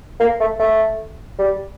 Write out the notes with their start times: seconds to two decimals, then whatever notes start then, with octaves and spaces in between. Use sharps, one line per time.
0.20 A#3
0.40 A3
0.59 A3
1.39 G3